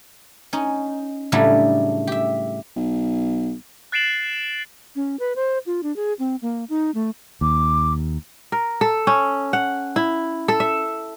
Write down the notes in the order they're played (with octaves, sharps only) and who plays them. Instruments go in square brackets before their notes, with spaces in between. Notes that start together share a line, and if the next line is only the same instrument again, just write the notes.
[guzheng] C#4 D#4
A2 C#3 F#3 G3 A3 D4
G4 E5
[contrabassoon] B1
[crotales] F#6 A6 C7 D7 E7 F#7
[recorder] C#4
B4
C5
F4
D4
G#4
C4
A#3
D#4
A3
[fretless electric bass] D#2 [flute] D6
[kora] A#4
A4
C#4
F#5
E4
A4
E5